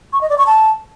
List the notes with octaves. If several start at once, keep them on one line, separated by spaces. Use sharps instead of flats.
C#6
D#5
D5
C#6
A5